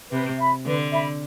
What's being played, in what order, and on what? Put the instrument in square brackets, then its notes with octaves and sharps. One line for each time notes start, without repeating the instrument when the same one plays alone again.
[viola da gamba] C3 [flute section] B4
[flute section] E5 B5
[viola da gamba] D3 [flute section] B4
[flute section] E5 B5